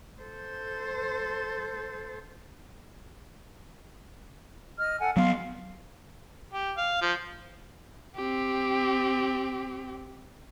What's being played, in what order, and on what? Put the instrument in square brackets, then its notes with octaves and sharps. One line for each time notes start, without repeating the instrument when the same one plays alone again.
[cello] A4 C5
[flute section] D#5 F6
A4 F#5 G#5
[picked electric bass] F#3 B3 [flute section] F5 C6
[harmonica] G4
F5
F3
[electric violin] C4 G4